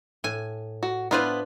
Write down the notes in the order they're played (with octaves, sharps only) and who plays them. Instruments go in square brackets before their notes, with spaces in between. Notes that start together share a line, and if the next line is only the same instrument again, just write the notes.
[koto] A2 G#5
[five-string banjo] F#4
[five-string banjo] B3 E4 C5 [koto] D4 F4 B4